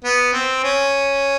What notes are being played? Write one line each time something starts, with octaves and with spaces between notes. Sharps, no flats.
B3
C4
C#4